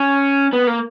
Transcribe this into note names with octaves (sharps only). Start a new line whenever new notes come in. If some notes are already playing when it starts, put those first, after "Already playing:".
Already playing: C#4
B3
A#3